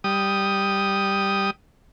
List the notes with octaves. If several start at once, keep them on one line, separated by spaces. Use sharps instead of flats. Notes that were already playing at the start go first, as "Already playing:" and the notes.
G3 D#6